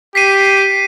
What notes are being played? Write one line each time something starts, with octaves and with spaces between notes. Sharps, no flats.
G4 B6 C7 D#7